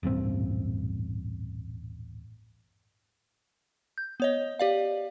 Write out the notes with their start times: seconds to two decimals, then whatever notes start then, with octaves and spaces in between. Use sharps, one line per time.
0.03 D#1 A1 G2 C4
3.98 G6
4.20 B3 C#5 D#5
4.59 G4 D5 F5